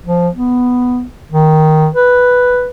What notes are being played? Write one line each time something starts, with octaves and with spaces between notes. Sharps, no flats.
F3
B3
D#3
B4